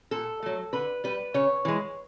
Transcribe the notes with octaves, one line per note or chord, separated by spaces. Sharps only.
A#2 A4
F#3 A3
D3 B4
G3 B4
C#3 C#5
E3 G#3